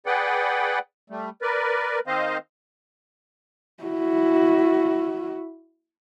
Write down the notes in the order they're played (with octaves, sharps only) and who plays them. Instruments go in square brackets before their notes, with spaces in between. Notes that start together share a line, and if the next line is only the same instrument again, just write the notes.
[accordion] G#4 B4 D5 F#5 G5
G3 A3
A#4 B4 D5
D#3 C4 C5 D#5 F5
[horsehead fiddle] E4 F#4